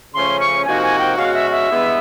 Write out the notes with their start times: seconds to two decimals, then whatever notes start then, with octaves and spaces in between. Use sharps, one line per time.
0.14 C#3 F3 A3 C#4 C6
0.40 C#6
0.65 C3 F3 A#3 D#4 F#4 G#5
0.83 G#5
0.99 G5
1.17 B2 G#3 C#4 F#4 F5
1.34 E5
1.51 E5
1.68 G2 E3 G#3 B3